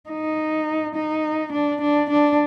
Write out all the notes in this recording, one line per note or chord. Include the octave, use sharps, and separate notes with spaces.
D#4
D#4
D4
D4
D4